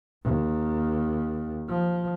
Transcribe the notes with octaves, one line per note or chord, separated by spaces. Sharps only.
D#2
F3